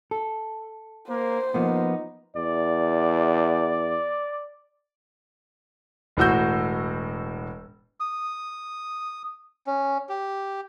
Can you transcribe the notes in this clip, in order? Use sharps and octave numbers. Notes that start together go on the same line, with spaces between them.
A4
A#3 C5
F3 A#3 B3 D#4
E2 D5
E1 A2 F#4 E6 G6
D#6
C#4
G4